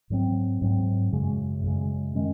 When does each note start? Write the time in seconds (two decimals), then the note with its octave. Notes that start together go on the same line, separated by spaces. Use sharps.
0.10 G#2 F#3 C4
0.62 G#2 F#3 C4
1.12 F#2 C#3 G#3
1.64 F#2 C#3 G#3
2.15 D#3 G#3 C#4